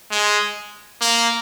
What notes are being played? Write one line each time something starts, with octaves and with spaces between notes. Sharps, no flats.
G#3
A#3